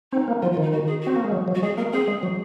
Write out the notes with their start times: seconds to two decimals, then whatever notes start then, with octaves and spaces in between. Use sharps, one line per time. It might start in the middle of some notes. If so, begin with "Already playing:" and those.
0.12 C4 D#4
0.28 A#3
0.42 F3 F4
0.53 F4
0.57 D#3
0.62 D#4
0.73 F#4
0.87 G#4
1.02 C4 F#4
1.16 A#3
1.24 G#3
1.32 F#3
1.48 F#3
1.55 F#4
1.63 G#3 G#4
1.78 A#3 A#4
1.93 C4 G#4
2.08 G#3
2.23 F#3